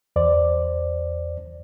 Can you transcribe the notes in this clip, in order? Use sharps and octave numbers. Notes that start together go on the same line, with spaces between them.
E2 C5 D5